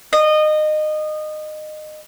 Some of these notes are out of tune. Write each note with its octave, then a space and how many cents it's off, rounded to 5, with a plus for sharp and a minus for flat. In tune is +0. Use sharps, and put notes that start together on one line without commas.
D#5 -25